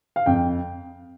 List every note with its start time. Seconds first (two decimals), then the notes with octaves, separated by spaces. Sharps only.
0.16 F5
0.26 F2 G5